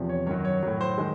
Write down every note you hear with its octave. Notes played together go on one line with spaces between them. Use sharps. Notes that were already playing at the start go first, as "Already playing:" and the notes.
Already playing: E2 C3 F3
C#5
F#2 D#3 F#3 C#5
C#5
A2 F#3 C#5
C5
D#3 G#3